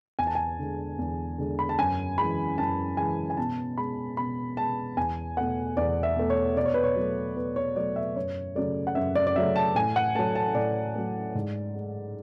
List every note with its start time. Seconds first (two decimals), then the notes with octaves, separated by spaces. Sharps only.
0.19 E2 G#5
0.27 A5
0.35 G#5
0.59 D3 G#3
0.99 E2
1.38 D3 G#3
1.59 B5
1.69 A5
1.78 F#2 G#5
2.18 E3 G#3 B5
2.58 F#2 A5
2.97 E3 G#3 G#5
3.30 G#5
3.37 B2 A5
3.78 G#3 B5
4.17 B2 B5
4.57 G#3 A5
4.97 E2 G#5
5.37 B2 A3 F#5
5.77 E2 D5
6.03 E5
6.16 B2 A3
6.30 C#5
6.57 B2 D5
6.66 C#5
6.74 B4
6.84 C#5
6.96 F#3 A3
7.36 B2 B4
7.56 C#5
7.76 F#3 A3 D5
7.96 E5
8.16 F#2 C#5
8.55 C#3 F#3 A3 D5
8.87 F#5
8.95 F#2 E5
9.15 D5
9.27 D5
9.35 C#3 F#3 A3 E5
9.56 A5
9.75 A2 G#5
9.96 F#5
10.15 F#3 A3 A5
10.35 A5
10.55 A2 D5
10.95 F#3 A3
11.35 G#2
11.75 G#3